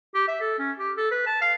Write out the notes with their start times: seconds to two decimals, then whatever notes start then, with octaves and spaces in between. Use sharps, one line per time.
0.15 G4
0.28 E5
0.41 A4
0.59 C#4
0.79 G4
0.98 A4
1.11 B4
1.27 A5
1.41 F5